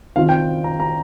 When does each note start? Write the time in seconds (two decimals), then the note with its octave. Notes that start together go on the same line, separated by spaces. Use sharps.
0.16 D#3 C4 F4 F5
0.29 G5
0.64 A#5
0.80 A#5